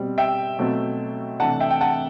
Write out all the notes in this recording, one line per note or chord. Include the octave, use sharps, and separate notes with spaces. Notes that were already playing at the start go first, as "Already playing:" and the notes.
Already playing: B2 G3 C4
E5 G5
B2 F#3 A3 C4
C3 E3 A3 D4 F#5 A5
E5 G5
G5
F#5 A5